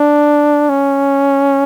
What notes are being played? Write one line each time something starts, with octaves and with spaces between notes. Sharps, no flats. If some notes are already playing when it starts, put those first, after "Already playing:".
Already playing: D4
C#4